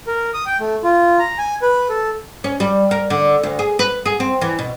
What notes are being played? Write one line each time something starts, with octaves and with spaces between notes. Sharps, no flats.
A#4
D#6
G5
A3
F4
A#5
G#5
B4
A4
C#4
G3
A#4
D3
D2
G#4
B4
G#4
C4
E3
B2